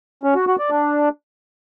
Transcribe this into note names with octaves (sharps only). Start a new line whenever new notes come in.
C#4
F#4
F#4
D5
D4